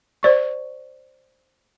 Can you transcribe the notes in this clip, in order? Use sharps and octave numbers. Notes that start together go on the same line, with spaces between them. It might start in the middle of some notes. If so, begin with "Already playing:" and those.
C5 D5 C#6